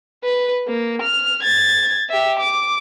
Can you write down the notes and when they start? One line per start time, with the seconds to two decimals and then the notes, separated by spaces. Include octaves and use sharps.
0.24 B4
0.67 A#3
1.02 F6
1.43 G#6 A6
2.10 G4 E5
2.40 D6